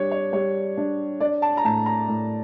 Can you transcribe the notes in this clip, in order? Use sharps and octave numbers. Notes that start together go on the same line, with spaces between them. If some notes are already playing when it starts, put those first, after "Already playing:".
Already playing: G3 D4 C#5
C#5
G3 C#5
D4
D4 D5
A5
A#5
A2 A5
A#5
A2